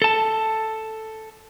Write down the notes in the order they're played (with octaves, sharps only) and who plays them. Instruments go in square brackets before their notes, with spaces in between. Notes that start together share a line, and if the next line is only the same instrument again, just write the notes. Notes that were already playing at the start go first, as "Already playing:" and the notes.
[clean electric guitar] A4 A5